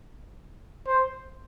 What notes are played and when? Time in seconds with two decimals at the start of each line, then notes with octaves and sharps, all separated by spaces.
0.87 C5